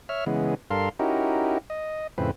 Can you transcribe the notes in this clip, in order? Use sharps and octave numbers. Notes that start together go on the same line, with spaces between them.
C#5 E5 F6
C#3 E3 G#3 B3
G2 A4 A#4 F5 C6
C#4 D#4 E4 F#4 G4 A#4
D#5
F2 A2 C#3 C4 B4